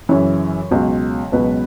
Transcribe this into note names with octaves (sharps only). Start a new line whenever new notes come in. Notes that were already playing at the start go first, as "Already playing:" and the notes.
F#2 C#3 E3 C#5
C#2 B2 F#3
C#2 B2 F#3 B4